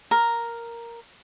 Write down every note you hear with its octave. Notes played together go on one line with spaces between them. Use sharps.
A#4